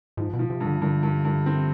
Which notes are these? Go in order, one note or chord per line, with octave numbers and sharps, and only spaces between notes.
G#2 F3
B2
F3
C3
G2
D3
G2 D3
G2
G2
C4